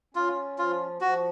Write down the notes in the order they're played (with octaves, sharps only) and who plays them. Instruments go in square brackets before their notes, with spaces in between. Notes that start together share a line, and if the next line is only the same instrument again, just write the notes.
[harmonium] C#4 [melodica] F4
[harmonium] F3 [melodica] F4
[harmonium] F3 [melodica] F#4